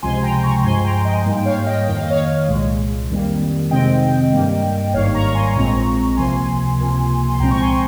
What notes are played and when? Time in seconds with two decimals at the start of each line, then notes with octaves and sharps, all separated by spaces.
0.02 C#2 C3 F3 G#3 G#5 C6
0.23 G5 A#5
0.44 A#5 C#6
0.64 G2 F3 G#3 G#5 C6
0.84 G5 A#5
1.05 D#5 G5
1.25 G#2 G3 A#3
1.36 G5
1.46 C#5 F5
1.60 F5
1.66 D#5 G5
1.87 F2 D#3 A#3 G5
1.95 F5
2.03 D#5
2.10 C#5 F5
2.49 C2 A#2 G#3
3.10 F2 D#3 G3 A#3
3.71 F2 C3 D#3 G#3 C4 D#5 G5
4.33 G2 G3 A#3
4.94 G#1 G#2 G3 A#3 C#5 F5
5.15 A#5 C#6
5.26 C#6
5.35 G#5 C6
5.56 A#1 A#2 G#3 C4 A#5 C#6
6.17 C#2 C3 F3 A#3 G#5 C6
6.79 C#2 C3 F3 A#3
7.31 C6
7.40 C2 A#2 F3 G#3 C4 G5 A#5
7.51 C#6
7.60 G#5 C6